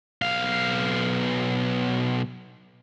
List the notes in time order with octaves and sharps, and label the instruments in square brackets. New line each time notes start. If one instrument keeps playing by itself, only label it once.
[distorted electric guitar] B1 F5